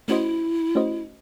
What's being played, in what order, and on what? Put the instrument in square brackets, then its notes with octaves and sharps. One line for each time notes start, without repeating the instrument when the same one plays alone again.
[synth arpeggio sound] A3 C#4 F#4 C5 D#5 [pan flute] E4
[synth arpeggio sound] A3 C#4 F#4 C5 D#5